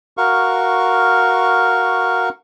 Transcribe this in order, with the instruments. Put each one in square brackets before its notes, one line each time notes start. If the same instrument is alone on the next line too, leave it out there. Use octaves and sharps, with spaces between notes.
[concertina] F#4 A#4 F5 C#6